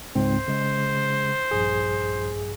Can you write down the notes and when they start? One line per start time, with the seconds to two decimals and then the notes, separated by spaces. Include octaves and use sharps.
0.15 C#2 G#2 C4 C5
0.48 C#3 G#3
1.51 A#1 G2 G#4